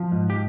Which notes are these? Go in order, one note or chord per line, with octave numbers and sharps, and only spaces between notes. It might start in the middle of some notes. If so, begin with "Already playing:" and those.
Already playing: F3
G#2
G4